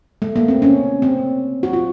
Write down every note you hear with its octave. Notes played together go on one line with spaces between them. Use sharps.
A3
A#3
C4
C#4
C4
F#4
F4